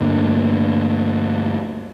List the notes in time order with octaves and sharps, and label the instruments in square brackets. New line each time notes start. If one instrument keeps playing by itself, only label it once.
[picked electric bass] D2 G2 A#3 D4